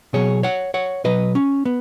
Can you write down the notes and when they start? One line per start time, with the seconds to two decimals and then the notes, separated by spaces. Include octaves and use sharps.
0.13 B2 F#3 G#4 C#5
0.43 C#5 F#5
0.74 C#5 F#5
1.04 B2 F#3 B4 D#5
1.35 C#4
1.65 B3